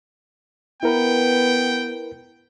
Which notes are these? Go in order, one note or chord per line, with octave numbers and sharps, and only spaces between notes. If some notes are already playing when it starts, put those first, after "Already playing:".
B3 E4 A#4 B4 G5